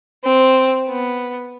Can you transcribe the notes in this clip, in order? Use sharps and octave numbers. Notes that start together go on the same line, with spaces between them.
C4
B3